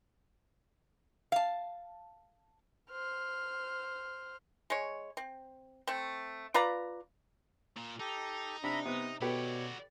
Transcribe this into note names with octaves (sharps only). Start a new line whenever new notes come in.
F5 A5
C5 F6
G#3 C#5
C4
A3 C4
F4 B4 D5 A#5
A#2
D#4 G4 A4
C3 D4 E5 A#5 B5
C3 B3 D#6
B2 F#4 G4 A4 B4 C#5 D5